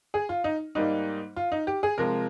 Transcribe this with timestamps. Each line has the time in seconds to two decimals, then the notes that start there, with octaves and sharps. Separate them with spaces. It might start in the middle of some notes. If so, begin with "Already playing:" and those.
0.14 G#4
0.29 F4
0.44 D#4
0.75 G#2 G3 A#3 D#4
1.36 F4
1.52 D#4
1.67 G4
1.83 G#4
1.98 C3 F3 G#3 A#4